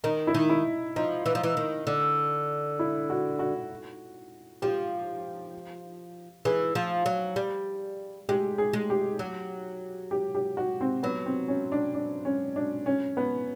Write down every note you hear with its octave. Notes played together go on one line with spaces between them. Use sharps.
D#3 D#4
E4
D#3
E4
F3 D#4
E3
F3
E3
D#3
D3
E4
F#4
F#4
F3 G4
E3 G#4
F3
F#3
G3
G#3 G4
G#4
G#3
G4
F#3
G4
G4
F#4
C4
F#3 B3
C4
C#4
D4
D4
C#4
D4
C#4
B3